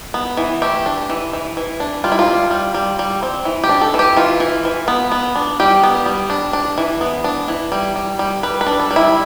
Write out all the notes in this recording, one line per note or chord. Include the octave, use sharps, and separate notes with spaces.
B3
E3
A3 G4
D4
E3
E3
E3
D4
G3 F4
E4
F4
G3
G3
G3
G3
C4
E3
G4
D4
A4
E3
G4
E3 F4
E3
E3
B3
B3
D4
G3 G4
B3
G3
D4
D4
E3
B3
D4
E3
G3
G3
G3
G3 B4
B4
D4
A4
G3
E4